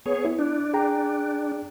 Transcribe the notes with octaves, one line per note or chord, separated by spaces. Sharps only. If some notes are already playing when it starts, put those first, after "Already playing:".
B3 G#4 C#5
E4
D4
G#4 G5 A#5